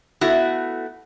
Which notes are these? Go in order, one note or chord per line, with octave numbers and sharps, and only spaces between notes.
A3 B3 E4 F#4